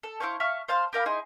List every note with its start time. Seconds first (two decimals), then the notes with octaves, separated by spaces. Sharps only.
0.03 A4
0.20 E4 C5 F5 C#6
0.40 E5 F5 C#6 F6
0.68 C5 F5 A5 C6
0.93 G4 A#4 F5 B5
1.06 D#4 E4 G#4 C6